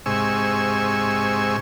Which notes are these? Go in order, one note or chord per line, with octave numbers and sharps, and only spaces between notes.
G#2 C3 G#5 C#6 E6